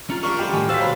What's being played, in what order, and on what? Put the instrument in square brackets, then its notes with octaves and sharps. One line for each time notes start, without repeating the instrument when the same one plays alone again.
[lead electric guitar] C#4 F4 [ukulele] A#5
[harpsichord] A#3 D4 G4 [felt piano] C#6 F6
[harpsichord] D3 G3 C4 [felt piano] G4 [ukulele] D#5
[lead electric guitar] A2 D#3 [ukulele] G#4 A4 G#5
[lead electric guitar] F#4 F5 [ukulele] B4 C5 [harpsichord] A5 [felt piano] E6 B6
[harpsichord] B1 C4 [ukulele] C#4 A#5 B5